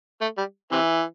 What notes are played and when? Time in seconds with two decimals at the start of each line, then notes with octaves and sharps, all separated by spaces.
0.21 A3
0.37 G3
0.72 C3 E3